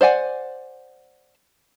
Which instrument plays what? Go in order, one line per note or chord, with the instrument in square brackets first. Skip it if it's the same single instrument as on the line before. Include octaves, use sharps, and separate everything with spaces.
[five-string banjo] C5 D5 F#5 G#5